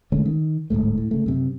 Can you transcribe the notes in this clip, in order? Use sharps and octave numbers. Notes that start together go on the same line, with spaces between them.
D3 G#3 A3 C#4
D#3
D1 G1 G#2 A3
A2
C#3 A3
F#2 C3